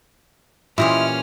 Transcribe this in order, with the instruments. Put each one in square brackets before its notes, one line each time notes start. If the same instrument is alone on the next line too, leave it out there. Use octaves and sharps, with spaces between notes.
[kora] A#2 E3 G4 [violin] C#4 F6 [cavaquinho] E4 D#5 C6